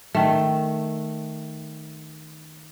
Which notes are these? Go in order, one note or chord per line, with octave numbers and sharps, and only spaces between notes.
D#3 A3